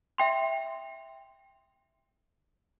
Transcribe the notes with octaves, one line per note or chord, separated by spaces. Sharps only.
E5 G5 C6